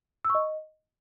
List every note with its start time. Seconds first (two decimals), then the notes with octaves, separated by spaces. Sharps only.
0.25 E6
0.30 C#6
0.35 D#5